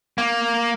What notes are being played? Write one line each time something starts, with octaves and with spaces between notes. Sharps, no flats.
A#3